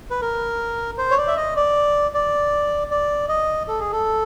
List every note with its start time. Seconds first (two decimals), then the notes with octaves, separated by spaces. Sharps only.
0.10 B4
0.22 A#4
0.98 C5
1.11 C#5
1.17 D5
1.27 E5
1.37 D#5
1.56 D5
2.14 D5
2.91 D5
3.28 D#5
3.68 A4
3.80 G#4
3.92 A4